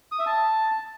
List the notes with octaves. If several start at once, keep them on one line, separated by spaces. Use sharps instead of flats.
D#6
E5
A5